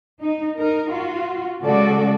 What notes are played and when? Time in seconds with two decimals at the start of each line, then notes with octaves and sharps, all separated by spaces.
0.20 D#4
0.56 D#4 A#4
0.91 F4 F#4
1.61 C#3 G#3 C#4 F#4 A4 D5